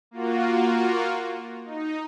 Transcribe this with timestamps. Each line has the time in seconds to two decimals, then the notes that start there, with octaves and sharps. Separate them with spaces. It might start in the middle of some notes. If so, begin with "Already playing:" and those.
0.11 A#3 F4 F#4
1.65 D#4